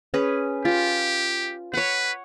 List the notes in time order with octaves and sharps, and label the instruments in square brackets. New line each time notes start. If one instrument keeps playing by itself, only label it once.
[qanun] C#4 G#4 B4
[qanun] F4 [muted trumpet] G4
[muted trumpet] B4 [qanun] C#5 F#5